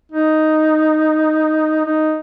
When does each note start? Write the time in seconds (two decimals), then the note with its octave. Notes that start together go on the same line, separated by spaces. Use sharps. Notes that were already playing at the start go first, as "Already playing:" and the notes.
0.12 D#4
1.86 D#4